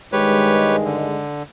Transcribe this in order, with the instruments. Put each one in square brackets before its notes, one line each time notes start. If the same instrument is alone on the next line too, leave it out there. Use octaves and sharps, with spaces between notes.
[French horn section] G2 D#3 G#3 [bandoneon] G4 B4 C#5
[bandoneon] D3